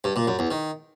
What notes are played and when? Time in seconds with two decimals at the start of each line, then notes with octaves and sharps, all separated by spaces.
0.04 G2
0.16 A#2
0.27 F#2
0.39 E2
0.51 D#3